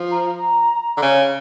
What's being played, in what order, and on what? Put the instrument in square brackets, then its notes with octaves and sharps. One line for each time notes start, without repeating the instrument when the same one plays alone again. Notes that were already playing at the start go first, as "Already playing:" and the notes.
Already playing: [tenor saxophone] F3
[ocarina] A#5
[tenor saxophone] D3
C#3